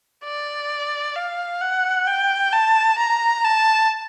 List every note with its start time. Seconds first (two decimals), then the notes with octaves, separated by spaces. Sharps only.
0.24 D5
1.16 F5
1.61 F#5
2.07 G5
2.53 A5
2.98 A#5
3.44 A5